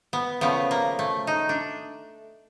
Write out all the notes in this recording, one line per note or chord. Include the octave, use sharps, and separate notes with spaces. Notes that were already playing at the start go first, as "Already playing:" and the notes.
B3
C#3 F3 A3 B3
A#3
A3
D#4
D4